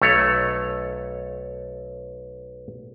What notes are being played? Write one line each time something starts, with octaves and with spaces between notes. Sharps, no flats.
B1 A3 C#5